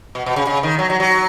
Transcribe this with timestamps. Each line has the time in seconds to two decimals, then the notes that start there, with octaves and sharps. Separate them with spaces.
0.15 B2
0.26 B2
0.36 C#3
0.47 C#3
0.63 D#3
0.79 F#3
0.90 F#3
1.00 F#3